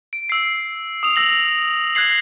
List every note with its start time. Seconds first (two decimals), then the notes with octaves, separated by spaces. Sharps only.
0.13 D7
0.29 E6 C7
1.03 D#6 F7
1.16 E6 A#6 F#7
1.95 F#6 G#6 A#6 C7 F#7